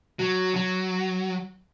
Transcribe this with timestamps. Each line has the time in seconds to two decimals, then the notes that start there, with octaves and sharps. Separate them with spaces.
0.19 F#3
0.55 F#3